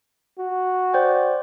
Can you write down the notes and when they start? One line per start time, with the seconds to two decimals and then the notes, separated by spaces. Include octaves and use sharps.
0.39 F#4
0.93 C5 D5 G5